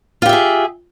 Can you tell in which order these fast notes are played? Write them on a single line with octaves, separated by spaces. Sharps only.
F4 G4 E5 G#4